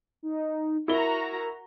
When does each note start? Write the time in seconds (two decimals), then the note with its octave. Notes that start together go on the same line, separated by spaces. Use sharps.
0.23 D#4
0.88 E4 F#4 A#4 A#5 G7